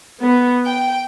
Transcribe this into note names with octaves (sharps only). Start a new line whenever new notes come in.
B3
G5